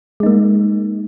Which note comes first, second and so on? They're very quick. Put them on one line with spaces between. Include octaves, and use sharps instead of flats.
G#3 D#4 A#3